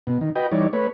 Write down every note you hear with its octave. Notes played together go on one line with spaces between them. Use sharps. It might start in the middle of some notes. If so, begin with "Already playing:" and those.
B2
D#3
F#4 B4 D#5 G5
E3 G3 D#4 C#5 D5
A3 B4 C#5